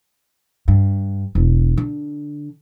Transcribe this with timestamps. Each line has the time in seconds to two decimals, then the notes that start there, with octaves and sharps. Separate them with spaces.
0.68 G2
1.35 E1
1.77 D3